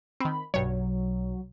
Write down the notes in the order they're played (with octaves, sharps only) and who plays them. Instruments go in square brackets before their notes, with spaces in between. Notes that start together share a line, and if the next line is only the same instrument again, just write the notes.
[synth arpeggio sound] D#3 C4 [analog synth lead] B5
[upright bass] B1 [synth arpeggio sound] G2 C#5 [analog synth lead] F#3